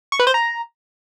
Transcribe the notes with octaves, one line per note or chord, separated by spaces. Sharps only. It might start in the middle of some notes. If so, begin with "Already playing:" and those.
C#6
B4
C5
A#5